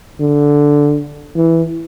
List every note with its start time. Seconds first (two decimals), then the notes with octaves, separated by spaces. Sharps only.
0.20 D3
1.36 E3